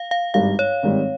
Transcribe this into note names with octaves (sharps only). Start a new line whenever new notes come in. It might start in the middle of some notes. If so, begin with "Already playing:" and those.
Already playing: F5
F5
G#1 G2 G3 F5
C#5
G#2 D#3 G3 C4